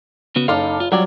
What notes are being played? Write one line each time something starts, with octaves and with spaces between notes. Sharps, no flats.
C#3 B3 F#4
F#1 D#4 A4 F5 D6 F6
F4
F#3 G3 F4 C#5 D5